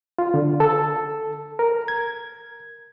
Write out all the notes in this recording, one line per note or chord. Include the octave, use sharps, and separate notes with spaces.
F4
D3
A4
A#4
G#6